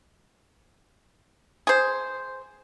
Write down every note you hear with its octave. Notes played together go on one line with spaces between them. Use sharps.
G#4 C5